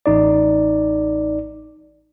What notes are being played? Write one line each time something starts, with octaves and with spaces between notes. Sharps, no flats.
A1 D#4 D5